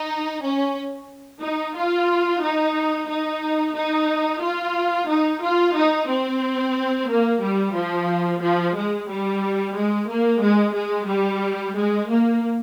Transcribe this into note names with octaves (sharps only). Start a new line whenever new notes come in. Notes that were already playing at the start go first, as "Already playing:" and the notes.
Already playing: D#4
C#4
D#4
F4
D#4
D#4
D#4
F4
D#4
F4
D#4
C4
A#3
G3
F3
F3
G#3
G3
G#3
A#3
G#3
G#3
G3
G#3
A#3